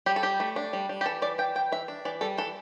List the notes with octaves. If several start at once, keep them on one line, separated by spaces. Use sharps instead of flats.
G3 G4
A4
G3 G4
A3
D4
G3
G3
G4
E3 A4
E3 D5
E3 G5
E3 G5
E3 E5
D4
E3 D5
G3 A4
E3 A4